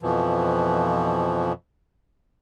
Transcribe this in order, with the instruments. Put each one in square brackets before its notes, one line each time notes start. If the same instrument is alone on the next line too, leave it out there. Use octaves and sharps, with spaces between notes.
[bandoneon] F2 B2 E3 F3